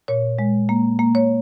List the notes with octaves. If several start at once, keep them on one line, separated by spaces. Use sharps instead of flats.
A#2 C#5
G#3
A#3
A#3
C#5